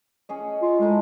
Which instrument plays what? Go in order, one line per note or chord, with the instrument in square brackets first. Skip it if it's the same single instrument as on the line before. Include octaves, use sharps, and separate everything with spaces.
[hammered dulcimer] C#4 G#4 D#5
[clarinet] F4
[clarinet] G#3 [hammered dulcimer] A3 D#4 E4